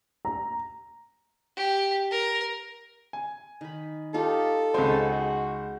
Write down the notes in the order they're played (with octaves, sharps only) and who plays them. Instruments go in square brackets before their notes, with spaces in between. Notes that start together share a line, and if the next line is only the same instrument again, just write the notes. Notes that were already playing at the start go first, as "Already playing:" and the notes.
[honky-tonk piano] A#5
[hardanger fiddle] G4
A#4
[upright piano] G#5
[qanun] D#3 B5
[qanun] D#4 F4 G4 [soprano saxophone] A4
[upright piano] C#2 C5 [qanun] G#3 G5 G#5 [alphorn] F#4